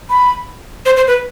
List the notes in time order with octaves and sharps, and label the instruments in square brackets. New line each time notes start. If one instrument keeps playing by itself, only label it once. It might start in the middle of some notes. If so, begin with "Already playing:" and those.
[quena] B5
C5
C5
B4